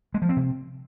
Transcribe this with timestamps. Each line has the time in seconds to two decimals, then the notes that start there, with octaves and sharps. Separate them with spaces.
0.14 G#3
0.22 F3
0.29 C4
0.37 C3